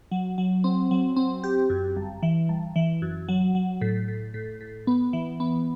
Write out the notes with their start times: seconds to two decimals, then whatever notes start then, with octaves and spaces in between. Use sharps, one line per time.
0.11 F#3
0.38 F#3
0.64 C4
0.91 F#3
1.16 C4
1.44 G4
1.70 F#2
1.96 G1
2.23 E3
2.49 G1
2.76 E3
3.02 F#2
3.29 F#3
3.55 F#3
3.81 A2
4.08 A2
4.34 A2
4.61 A2
4.87 B3
5.13 E3
5.40 B3